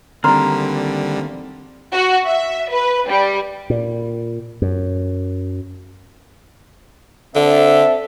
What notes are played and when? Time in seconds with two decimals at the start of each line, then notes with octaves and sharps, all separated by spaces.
0.24 D3 D#3 G3 A#3 C4 A#5 C6 F6
1.92 F#4
2.27 E5
2.72 B4
3.08 G3
3.70 A#2
4.62 F#2
7.35 D3 C4 A4 E5